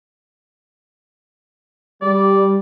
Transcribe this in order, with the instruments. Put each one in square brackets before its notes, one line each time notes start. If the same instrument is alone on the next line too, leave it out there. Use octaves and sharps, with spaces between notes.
[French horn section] G3 [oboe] D5